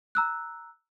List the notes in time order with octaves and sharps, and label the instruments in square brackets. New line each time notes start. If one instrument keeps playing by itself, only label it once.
[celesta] A#5 E6 F#6